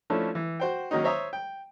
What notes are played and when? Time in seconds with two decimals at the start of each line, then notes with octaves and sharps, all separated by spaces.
0.10 F3 A3 C#4 D4 E4 A4
0.35 E3
0.60 F#4 C5 G5
0.91 D#3 F#3 A#3 C#4 D#4
1.04 C5 C#5 E5 A#5 D#6
1.33 G5